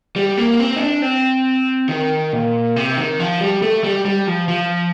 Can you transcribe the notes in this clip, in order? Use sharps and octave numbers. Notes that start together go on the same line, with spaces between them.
G3
A#3
C4
D#4
D4
C4
D#3
A#2
C3
D#3
F3
G3
A3
G3
G3
F3
F3